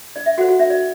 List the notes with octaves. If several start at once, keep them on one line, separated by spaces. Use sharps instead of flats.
D4 D5
E5
F#4 A4 C5 F#5
F#4 F#5
D4 E5
D5